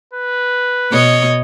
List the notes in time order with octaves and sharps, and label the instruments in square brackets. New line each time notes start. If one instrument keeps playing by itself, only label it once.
[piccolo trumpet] B4
[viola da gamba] B2 C#5 D#5